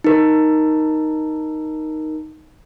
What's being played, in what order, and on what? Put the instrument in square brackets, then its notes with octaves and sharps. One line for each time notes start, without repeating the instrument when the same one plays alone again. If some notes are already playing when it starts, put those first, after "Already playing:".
[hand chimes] D#4 A#4